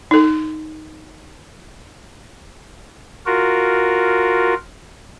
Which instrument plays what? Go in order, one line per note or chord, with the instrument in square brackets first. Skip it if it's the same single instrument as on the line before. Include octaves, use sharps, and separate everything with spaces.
[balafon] D#4 A4
[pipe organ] F4 F#4 A#4